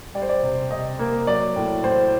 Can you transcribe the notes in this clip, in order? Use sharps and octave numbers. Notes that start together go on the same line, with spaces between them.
G3 D5
C5
D5
C3
C3 D#5
A#3
F#3 D5
A2
A2 C5